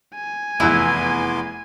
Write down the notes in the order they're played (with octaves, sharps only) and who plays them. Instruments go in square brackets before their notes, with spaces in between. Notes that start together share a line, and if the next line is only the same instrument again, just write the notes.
[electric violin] G#5
[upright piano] F1 E2 F#6 [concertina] B3 C6 D6 [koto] E4